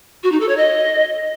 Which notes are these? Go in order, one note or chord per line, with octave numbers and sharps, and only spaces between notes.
F#4
D#4
A4
C#5
D#5